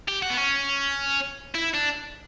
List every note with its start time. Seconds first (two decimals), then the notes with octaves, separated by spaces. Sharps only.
0.08 G4
0.22 F#4
0.30 B3
0.37 C#4
1.55 E4
1.74 D4